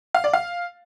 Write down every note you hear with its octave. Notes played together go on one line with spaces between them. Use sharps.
F5
D5
F5